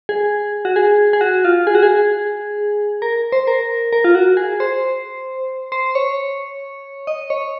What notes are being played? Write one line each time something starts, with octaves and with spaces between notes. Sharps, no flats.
G#4
F#4
G#4
G#4
F#4
F4
G#4
F#4
G#4
A#4
C5
A#4
A#4
F4
F#4
G#4
C5
C5
C#5
D#5
C#5